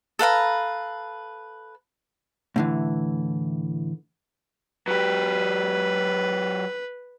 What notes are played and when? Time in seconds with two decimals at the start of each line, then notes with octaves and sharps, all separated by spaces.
0.19 A4 B4 F5 A#5
2.56 A2 D3 E3
4.88 F#3 G4 B4